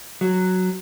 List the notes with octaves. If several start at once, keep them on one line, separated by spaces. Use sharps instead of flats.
F#3